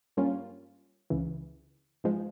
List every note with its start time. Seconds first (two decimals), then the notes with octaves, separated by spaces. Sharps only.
0.17 G2 G3 A#3 C#4 F4
1.10 C#2 C#3 E3
2.04 G#2 F3 G#3